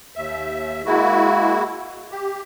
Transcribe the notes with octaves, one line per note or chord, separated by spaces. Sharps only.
D#2 E5
G#3 A#3 E4 F#4
G4